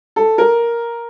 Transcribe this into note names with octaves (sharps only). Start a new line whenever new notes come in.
A4
A#4